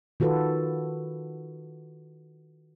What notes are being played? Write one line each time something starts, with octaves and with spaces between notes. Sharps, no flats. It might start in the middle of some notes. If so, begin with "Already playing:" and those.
D#3 F4 F#4 A4 B4